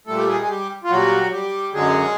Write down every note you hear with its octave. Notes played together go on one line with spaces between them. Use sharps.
A#2 G3 A3 A4
G4
G#3 G#4
G#4
G3 G4
F4
A#2 F#3 G3 F#4
G3 G4
F#2 D3 F#3 G#3 G#4